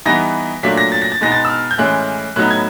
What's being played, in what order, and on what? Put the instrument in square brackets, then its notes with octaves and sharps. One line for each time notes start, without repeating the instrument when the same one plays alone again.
[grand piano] E3 G3 B3 D#4 A#6
A#2 F#3 A3 D4 B6
A#6
A6
A#6
A6
B2 G#3 B3 D#4 A#6
A6
E6
F6
G6
A2 E3 G#3 C#4 F#6
A2 F#3 B3 D#4 F#6
G#6